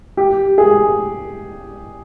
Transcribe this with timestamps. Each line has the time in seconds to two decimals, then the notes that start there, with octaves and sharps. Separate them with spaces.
0.17 G4
0.58 G#4